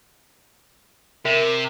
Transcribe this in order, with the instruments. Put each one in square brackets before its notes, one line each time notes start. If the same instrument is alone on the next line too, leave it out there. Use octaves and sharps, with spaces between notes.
[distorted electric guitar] C3 [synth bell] A#4 E5